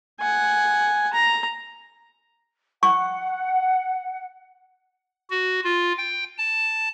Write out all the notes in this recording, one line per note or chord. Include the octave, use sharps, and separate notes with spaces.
F#5 G#5
A#5
F#5 C#6
F#4
F4
G5
A5